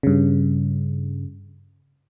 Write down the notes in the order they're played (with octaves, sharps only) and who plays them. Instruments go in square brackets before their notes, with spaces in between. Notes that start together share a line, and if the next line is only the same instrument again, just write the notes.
[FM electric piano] G2 C#3